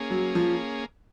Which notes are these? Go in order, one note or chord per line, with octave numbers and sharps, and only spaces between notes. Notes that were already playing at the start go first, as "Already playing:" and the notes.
Already playing: A#3 C#4 G#4
F#3
F3